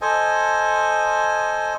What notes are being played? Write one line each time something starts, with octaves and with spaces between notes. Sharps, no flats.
A4 C5 D#5 G#5